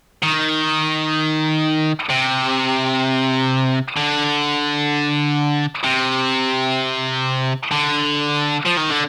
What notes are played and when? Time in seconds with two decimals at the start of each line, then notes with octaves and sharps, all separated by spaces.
0.23 D#3
2.10 C3
3.97 D3
5.84 C3
7.72 D3
8.65 F3
8.77 D#3
8.90 D3